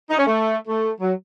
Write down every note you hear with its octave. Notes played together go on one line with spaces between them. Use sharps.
D#4
C#4
A3
A3
F#3